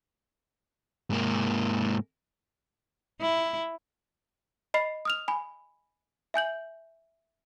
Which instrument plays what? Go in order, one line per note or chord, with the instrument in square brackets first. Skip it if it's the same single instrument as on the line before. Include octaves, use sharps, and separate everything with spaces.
[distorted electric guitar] G#2 A#3
[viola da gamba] E4
[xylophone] D#5 B5 C7
D#6 F6 F7
G#5 B5
E5 G#5 G6 F#7